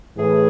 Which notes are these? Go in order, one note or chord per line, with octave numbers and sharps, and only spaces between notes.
A2 E3 G#4